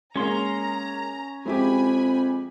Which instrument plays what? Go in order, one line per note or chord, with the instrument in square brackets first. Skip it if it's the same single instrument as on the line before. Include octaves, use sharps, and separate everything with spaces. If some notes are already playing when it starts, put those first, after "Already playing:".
[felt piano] G#3 A#3 [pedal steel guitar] C#4 C6 [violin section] A#5
[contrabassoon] F2 [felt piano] G#3 E4 G4 [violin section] G#5 B5